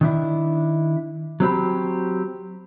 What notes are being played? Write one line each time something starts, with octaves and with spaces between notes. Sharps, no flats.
D#3 D4 E4
F#3 C4 G4 B5